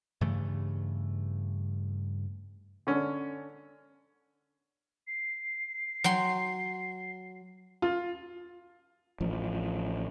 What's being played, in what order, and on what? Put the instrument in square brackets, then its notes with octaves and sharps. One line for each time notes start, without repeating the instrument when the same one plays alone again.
[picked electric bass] G2 C#3 E3 A3
[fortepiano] D3 C#4
[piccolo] C7
[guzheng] F#3 G5 C6
[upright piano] F4
[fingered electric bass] A1 F3